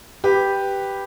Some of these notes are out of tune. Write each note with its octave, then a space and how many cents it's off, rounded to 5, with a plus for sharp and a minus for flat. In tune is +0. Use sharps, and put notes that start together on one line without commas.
G4 +0 B4 +0